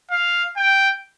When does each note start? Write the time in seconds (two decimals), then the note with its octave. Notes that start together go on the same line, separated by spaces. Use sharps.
0.11 F5
0.57 G5